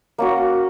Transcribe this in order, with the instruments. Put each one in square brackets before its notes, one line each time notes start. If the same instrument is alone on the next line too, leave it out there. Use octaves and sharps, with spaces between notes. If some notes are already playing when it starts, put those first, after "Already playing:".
[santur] A#3 C#4 F#4